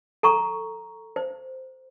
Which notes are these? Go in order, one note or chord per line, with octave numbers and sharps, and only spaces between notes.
A4 A#5 C#6
C5